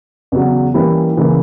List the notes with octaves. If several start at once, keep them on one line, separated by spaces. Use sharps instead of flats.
E2 C#3 F#3
E3 G3 A#3 C#4 E4
C#3 E3 A#3